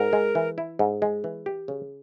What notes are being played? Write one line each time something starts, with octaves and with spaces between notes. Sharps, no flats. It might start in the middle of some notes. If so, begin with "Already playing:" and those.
Already playing: G#2 A#4
G#3
E3
E4
G#2
G#3
E3
G4
C#3